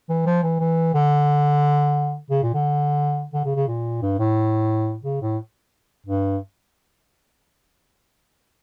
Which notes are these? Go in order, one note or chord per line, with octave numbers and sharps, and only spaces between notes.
E3
F3
E3
E3
D3
C#3
A#2
D3
D3
C#3
C#3
A#2
G2
A2
C#3
A2
G2